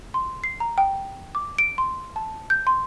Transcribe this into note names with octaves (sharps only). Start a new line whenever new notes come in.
C6
C7
A#5
G5
D6
D7
C6
A5
G6
C6